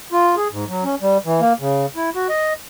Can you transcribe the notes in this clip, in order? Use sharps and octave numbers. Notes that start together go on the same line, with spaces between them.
F4
G#4
G#2
F#3
C#4
G3
E3
A#3
C#3
E4
F#4
D#5